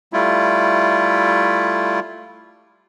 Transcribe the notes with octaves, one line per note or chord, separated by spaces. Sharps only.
G3 A3 E4 F4